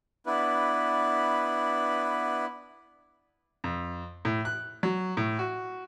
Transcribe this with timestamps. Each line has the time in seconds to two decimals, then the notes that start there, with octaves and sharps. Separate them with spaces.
0.26 B3 D4 E4 B4
3.64 F2
4.25 A2
4.45 F#6
4.83 F#3
5.17 A2
5.39 F#4